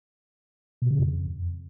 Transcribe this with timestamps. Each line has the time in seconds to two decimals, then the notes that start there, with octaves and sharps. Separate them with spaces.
0.82 B2
0.90 C#3
0.99 F2